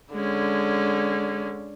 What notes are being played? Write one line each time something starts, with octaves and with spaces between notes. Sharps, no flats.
D3 G#3 C#4